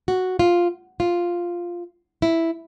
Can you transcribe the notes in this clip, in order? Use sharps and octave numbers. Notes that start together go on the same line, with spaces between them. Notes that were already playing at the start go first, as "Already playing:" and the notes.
F#4
F4
F4
E4